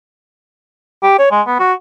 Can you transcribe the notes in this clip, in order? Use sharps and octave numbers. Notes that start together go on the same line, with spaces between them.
G4
C#5
G#3
B3
F#4